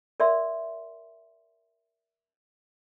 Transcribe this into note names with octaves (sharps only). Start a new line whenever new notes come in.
A#4 D5 E5 C6